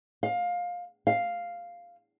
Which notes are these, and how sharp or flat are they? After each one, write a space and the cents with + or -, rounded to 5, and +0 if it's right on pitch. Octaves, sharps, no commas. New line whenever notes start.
F5 +20
F5 +0